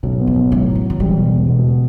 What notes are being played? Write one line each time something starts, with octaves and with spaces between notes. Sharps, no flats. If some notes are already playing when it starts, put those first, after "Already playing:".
B1 E3
B3
F3
B1
A2 F#3
F#3
F3
F#3
D#3
E3 G3
B2
E1
B2